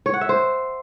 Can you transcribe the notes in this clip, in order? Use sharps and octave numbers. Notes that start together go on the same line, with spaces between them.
C#5
F#5
E5
C5